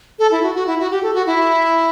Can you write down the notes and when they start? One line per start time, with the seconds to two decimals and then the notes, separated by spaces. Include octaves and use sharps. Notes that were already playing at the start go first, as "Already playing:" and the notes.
0.19 A4
0.31 E4
0.43 F#4
0.55 F#4
0.67 E4
0.79 F#4
0.91 G4
1.03 A4
1.14 F#4
1.26 E4